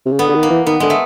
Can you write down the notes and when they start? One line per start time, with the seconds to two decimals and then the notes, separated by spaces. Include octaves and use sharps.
0.06 C3
0.12 C#3
0.19 D3 B3
0.29 D3
0.35 D#3
0.43 A#3
0.50 E3
0.67 D#3 B3
0.80 D3 G#3
0.90 A3